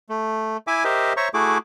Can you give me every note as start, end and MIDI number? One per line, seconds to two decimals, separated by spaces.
0.09 0.57 57
0.67 0.84 64
0.67 0.84 76
0.67 0.84 80
0.67 0.84 86
0.84 1.13 67
0.84 1.13 70
0.84 1.13 72
0.84 1.13 75
0.84 1.13 76
1.17 1.28 72
1.17 1.28 73
1.17 1.28 76
1.17 1.28 82
1.17 1.28 85
1.34 1.58 57
1.34 1.58 64
1.34 1.58 66
1.34 1.58 68
1.34 1.58 86